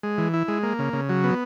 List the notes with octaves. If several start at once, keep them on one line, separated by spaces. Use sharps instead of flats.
G#3
E3
E4
G#3
A#3
C#3
C#3
F#3
B3